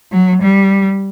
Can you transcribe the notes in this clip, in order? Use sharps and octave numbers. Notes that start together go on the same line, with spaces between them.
F#3
G3